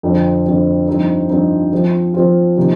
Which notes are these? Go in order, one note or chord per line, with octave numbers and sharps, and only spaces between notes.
F2 D3 F3 C4
F2 D3 F3 C4
G2 F3 C4 D#4
G2 F3 C4 D#4
F3 C4 F4
F3 C4 F4
C3 F3 A#3 D#4